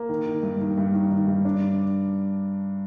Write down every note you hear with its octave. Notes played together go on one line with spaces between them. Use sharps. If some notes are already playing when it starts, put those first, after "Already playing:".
Already playing: A#3
D#3
D#3
G2
D#3
G2
D#3
D#3
G2
D4